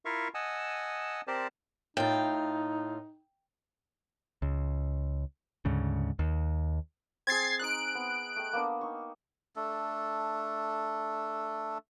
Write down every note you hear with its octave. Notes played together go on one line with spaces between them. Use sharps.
E4 F4 A#4 E5 F5 C#6
D#5 F#5 G#5 A5 D#6 E6
C4 G4 A#4 C5 D5 A5
A2 D#4 F4 G5
C#2
D2 G#2 C#3
D#2
C4 G#4 G#6 A6 C7
D#4 D#5 A#5 F#6 D7
B3
A3 G5
A#3 B3 D4
D#4 C#6
A3 D4 A4